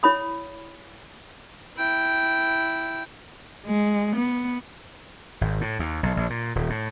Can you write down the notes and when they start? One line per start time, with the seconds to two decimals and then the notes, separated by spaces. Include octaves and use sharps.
0.03 E4 C#5 B5 D#6
1.77 E4 G5
3.66 G#3
4.16 B3
5.41 G#1
5.61 A2
5.79 D#2
6.03 B1
6.17 A#1
6.30 A#2
6.55 D#1
6.70 A2